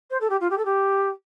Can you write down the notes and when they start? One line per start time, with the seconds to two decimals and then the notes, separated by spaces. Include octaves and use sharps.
0.10 C5
0.21 A4
0.30 G4
0.41 F4
0.50 G4
0.58 A4
0.65 G4